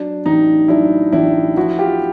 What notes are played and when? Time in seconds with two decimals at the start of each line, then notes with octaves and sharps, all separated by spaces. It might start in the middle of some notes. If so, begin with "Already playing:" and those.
Already playing: F#3 D4
0.26 A1 D#4
0.68 F#3 D4 E4
1.12 A1 D4 E4
1.57 F3 E4 F#4
1.78 F4 G4